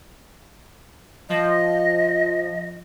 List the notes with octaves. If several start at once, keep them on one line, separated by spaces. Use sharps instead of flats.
F3 D#5